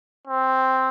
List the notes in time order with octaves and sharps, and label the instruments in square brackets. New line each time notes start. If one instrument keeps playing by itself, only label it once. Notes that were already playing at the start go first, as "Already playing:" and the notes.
[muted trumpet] C4